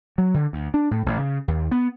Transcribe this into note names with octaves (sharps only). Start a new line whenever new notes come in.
F#3
D3
D2
D4
A2
A1
C#3
D#2
B3